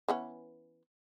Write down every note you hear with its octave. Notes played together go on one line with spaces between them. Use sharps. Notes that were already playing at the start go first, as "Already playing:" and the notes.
E3 B3 C#4